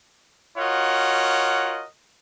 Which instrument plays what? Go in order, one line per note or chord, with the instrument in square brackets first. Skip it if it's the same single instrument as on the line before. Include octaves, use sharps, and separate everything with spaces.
[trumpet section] F4 F#4 A#4 C#5 D#5 F#5